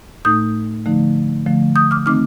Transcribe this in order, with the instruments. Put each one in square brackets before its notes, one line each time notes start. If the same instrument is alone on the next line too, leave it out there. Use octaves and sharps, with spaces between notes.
[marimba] A2 A3 D#4 D#6 G6
D3 F3 A3 D#4
D3 F3 A3
D#6 G6
D6 F6
D#3 A3 C4 D#4 D6 F6